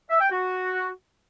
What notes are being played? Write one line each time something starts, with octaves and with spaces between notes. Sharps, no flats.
E5
G5
F#4